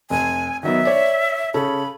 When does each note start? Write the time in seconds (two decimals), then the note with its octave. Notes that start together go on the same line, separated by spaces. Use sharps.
0.10 F1 G#5
0.63 D#3 F#3 B3 E5
0.85 C#5 D5
1.54 C#3 C#4 A4 B5